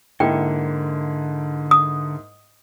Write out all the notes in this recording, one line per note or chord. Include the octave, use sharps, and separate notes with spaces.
G#2 D3 A#3 E4 G5
D#6